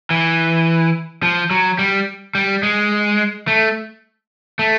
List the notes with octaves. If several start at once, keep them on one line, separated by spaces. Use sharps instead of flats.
E3
F3
F#3
G3
G3
G#3
A3
A3